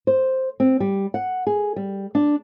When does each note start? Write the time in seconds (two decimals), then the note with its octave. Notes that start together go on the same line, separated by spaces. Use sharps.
0.07 C5
0.60 C4
0.80 G3
1.14 F#5
1.47 G#4
1.76 G3
2.15 D4